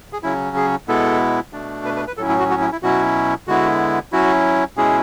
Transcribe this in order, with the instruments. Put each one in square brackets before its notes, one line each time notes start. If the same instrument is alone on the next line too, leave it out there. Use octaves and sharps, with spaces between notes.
[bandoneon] G#4
C#3 F#3 C#4 E4
G#4
B2 G#3 B3 E4 A4
B2 A3 D4
B4
B4
B4
A2 F#3 C#4 E4 A4
E4
F#4
F#4
E4
E4
B2 F#3 C#4 E4 F#4
D3 G#3 B3 E4 F#4
F#3 C#4 E4 F#4
B2 G#3 C#4 E4 G#4